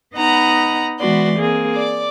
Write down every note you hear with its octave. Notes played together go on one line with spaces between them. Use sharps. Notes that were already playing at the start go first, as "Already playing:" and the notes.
B3 D#4 D#5 F#5 A#5 B5
E3 G#3 B3 F#4 D5 C6
A#3 C4 G#4
D5 D6